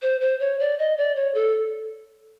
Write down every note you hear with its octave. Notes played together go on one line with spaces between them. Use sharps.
C5
C5
C#5
D5
D#5
D5
C#5
A4